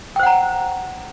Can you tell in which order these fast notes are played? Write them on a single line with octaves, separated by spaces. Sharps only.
G5 C5 F#5 A#5